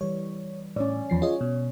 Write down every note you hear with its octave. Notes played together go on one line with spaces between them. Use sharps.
E3 G3 C#5
A2 C#4 C#5 D5
E2 F3 C7
F4 G#4 C#5 D#5
B2